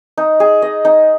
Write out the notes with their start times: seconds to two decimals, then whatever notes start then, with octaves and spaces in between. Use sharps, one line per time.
0.17 D#4
0.40 G#4
0.62 D#5
0.85 D#4